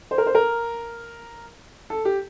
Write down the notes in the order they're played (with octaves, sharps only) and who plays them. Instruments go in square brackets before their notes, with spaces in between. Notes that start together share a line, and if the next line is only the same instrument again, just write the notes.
[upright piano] C5
A#4
C5
A#4
A4
G4